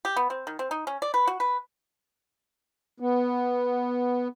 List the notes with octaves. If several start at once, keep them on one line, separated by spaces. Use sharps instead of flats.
G4
B3
C4
D#3
C4
D#4
C#4
D5
B4
F#4
B4
B3